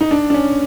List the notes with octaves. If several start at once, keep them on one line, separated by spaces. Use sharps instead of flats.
D#4
D4
D4
C#4